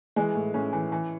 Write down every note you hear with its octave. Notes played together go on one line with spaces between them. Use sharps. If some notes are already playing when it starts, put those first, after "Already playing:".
E3 G#3
A2
A2 C#4
E3
E3